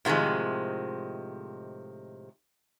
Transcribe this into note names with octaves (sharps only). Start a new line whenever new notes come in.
A2 C3 D#3 F3 G#3